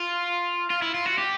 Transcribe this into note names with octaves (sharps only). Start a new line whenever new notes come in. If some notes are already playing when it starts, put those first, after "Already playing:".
Already playing: F4
F4
E4
F4
F#4
G4